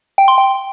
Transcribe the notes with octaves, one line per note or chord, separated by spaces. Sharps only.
G5
C6
G5